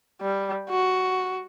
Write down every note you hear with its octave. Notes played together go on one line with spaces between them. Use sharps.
G3
F#4